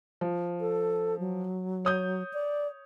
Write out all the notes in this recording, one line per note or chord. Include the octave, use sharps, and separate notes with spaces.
F3
A4
F#3
C#5 D#6 G6
D5